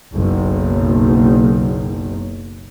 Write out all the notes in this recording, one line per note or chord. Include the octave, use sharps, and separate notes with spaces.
F#1 B1